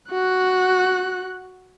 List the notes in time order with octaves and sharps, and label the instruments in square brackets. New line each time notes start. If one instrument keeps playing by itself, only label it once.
[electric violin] F#4 F#6